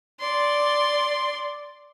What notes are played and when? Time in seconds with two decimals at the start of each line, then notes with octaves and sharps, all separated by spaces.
0.20 D5 C6